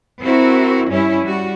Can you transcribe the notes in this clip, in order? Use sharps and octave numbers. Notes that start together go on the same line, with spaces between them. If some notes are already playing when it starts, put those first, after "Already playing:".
C4 E4 F#4 A#4
G2 G3 C#4 E4
G3 F#4